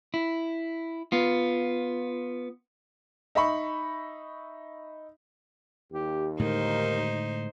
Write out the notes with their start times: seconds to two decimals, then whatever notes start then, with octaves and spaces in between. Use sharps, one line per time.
0.14 E4
1.12 B3 F4
3.35 D#4 E5 B5 C#6
5.92 D#2 G4
6.39 A2 D3 G#3 D#4 A#4 C5